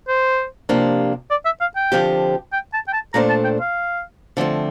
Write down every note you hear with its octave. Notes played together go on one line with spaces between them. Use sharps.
C5
C3 F3 A#3 D4 G4
D5
E5
F5
G5
D3 F3 C4 G4
G5
A5
G5
A5
A#2 A3 D4 A4 C5 A#5
A5
G5
F5
D3 F3 A3 C4